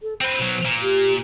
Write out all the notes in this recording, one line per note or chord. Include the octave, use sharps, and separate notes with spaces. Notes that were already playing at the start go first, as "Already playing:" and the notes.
A4
C4 B4 C5
B2 F#3
A#2
G4